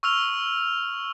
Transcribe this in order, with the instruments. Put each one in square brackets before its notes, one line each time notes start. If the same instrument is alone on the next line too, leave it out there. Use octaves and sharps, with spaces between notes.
[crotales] C#6 E6 F6 F7